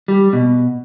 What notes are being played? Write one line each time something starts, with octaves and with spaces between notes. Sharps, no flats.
G3
B2